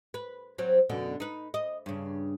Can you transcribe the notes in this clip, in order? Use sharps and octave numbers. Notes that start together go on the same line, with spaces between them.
B4
F#3 C4
F#2 B2 D3
D#4 B4
D#5
G2 C#3